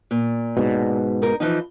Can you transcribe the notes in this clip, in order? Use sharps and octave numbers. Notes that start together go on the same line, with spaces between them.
A#2
G#2 B2
D#4 A#4
E3 F3 D#4